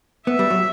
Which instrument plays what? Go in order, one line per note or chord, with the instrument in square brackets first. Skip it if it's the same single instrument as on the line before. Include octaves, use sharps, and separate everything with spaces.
[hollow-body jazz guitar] B3 [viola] E5
[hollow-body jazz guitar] G3
F#3